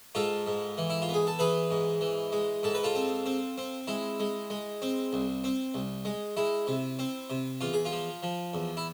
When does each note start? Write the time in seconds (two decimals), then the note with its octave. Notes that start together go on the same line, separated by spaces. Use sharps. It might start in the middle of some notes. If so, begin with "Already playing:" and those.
0.15 G#2 F4 A4
0.47 G#2
0.78 E3
0.90 E4
1.02 F4
1.09 B3
1.14 G#4
1.27 A4
1.39 E3 G#4 B4
1.71 G#2
2.01 E3
2.32 G#3
2.63 G#2 A4
2.74 B4
2.84 F4 A4
2.95 C4
3.26 C4
3.58 C4
3.87 G#3 E4
4.20 G#3
4.50 G#3
4.82 C4
5.13 C2
5.44 C4
5.74 C2
6.05 G#3
6.37 G#3 E4
6.67 C3
6.99 C4
7.30 C3
7.61 E2 F4
7.73 G#4
7.85 F4
7.92 F3
8.23 F3
8.54 E2
8.77 E4